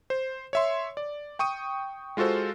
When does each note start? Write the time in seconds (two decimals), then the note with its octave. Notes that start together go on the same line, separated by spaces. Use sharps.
0.10 C5
0.53 C#5 E5 C6
0.97 D5
1.39 G5 C#6 D#6 D#7
2.17 G#3 F4 F#4 A4 C5